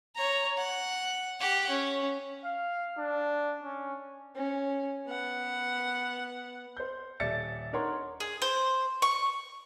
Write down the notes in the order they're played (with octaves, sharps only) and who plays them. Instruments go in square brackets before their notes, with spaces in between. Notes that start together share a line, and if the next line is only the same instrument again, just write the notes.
[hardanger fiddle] C#5 A#5
F#5
G4 F#5
C#4
[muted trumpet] F5
D4
C#4
[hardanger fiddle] C#4
B3 F#5
[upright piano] C5 G6
D#1 D5 E5 A6 C#7
D4 D#4 A#4 C#5 F#5 C6
[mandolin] G#4
C5
C#6